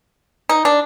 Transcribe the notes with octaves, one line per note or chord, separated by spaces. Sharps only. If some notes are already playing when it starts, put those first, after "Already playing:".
D#4
D4